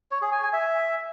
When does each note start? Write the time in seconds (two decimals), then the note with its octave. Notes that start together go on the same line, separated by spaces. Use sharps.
0.11 C#5
0.22 G#4
0.32 G#5
0.43 G#5
0.53 E5